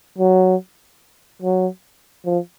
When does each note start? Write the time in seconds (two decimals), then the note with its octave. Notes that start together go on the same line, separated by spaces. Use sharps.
0.18 F#3
1.42 F#3
2.26 F3